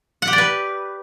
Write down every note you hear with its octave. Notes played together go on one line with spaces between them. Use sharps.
F#5
G4
D5
B4